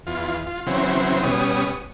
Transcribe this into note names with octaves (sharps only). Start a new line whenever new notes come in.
E2 F4
F4
C#3 E3 F#3 C4
B2 G3 C#4 D#6